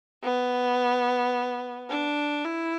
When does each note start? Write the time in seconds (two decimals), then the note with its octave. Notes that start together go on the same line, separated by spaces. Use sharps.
0.23 B3
1.90 D4
2.44 E4